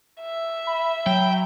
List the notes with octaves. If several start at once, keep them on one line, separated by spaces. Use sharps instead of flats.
E5
B5
F#3 G5